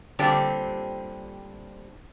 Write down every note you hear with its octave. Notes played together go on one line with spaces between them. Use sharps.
A#2 D3 G3 C4 D4 G4